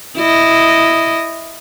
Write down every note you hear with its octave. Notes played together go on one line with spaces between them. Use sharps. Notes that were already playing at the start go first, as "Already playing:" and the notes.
E4 D#5